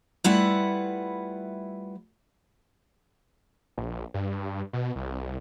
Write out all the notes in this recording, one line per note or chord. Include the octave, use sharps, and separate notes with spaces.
G3 A3 E4 F4 B4 F#5
A#1
G2
B2
C2